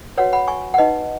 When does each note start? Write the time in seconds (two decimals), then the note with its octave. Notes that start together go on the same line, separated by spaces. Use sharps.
0.17 F#4 B4 C#5 F#5
0.33 F#5 B5
0.48 G#5 C#6
0.74 F#5
0.78 D#4 B4 D#5